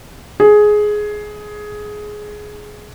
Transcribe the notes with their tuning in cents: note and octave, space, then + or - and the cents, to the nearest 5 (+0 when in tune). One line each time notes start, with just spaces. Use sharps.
G#4 +10